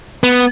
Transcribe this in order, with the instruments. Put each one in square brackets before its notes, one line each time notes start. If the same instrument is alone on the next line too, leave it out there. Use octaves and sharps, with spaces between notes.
[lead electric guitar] B3